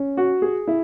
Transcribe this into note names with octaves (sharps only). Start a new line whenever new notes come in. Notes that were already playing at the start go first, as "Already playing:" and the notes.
Already playing: C#4
F#4
G#4
E4